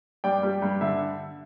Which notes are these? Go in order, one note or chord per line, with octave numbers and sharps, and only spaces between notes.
G2 D5 G5
G3
G2
D3 E5